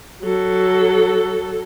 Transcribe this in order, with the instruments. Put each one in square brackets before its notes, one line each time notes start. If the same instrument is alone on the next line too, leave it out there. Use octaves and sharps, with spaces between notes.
[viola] F#3 A4